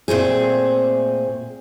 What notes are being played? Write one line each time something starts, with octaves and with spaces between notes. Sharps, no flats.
A#2 A3 C4 G#4